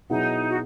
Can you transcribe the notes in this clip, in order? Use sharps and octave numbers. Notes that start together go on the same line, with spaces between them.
B2 F#3 B3 D#4 E4 G#4
F#4